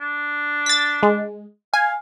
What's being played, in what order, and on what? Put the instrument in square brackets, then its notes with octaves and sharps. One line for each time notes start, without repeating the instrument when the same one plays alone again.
[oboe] D4
[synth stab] A6 B6
G#3
[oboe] F5 [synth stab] G#5